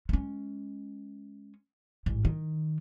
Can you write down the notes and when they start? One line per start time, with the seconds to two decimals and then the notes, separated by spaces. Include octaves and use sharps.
0.09 G#3 C#4
2.06 A1 G#2
2.25 D#3